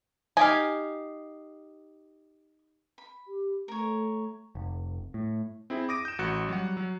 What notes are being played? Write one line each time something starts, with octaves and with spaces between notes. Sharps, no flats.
D#4 G4 F5 G#5
B5
G4
A3 A#4 C#5
F1
A2
C4 E4 G#4
D6 D#6 A#6 D7 D#7
G6 E7
A1 F#4 F#6 C#7
F#3 G3 F#5
F#3